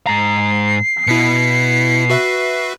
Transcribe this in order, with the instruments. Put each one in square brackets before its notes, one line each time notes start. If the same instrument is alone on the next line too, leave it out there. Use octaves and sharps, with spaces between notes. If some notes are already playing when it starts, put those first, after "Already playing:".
[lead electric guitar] G#2 A#5 [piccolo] C7
[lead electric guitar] B2 [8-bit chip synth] E4 B6 C#7
[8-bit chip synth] F#4 B4 E5